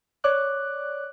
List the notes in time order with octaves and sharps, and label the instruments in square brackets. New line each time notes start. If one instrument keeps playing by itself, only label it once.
[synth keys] C#5 D5 D6 F#6